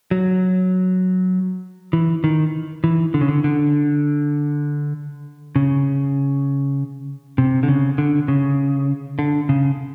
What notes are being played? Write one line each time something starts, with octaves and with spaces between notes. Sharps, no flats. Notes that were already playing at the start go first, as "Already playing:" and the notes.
F#3
E3
D#3
E3
D3
C#3
D3
D3
C#3
C3
D3
C#3
D3
C#3
D3
C#3